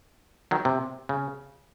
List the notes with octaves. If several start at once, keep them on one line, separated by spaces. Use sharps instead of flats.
D#3 F#3
C3
C#3